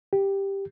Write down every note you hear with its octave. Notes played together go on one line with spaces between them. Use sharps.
G4